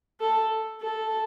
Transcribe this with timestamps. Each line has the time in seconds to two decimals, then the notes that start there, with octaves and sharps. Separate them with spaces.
0.20 A4
0.81 A4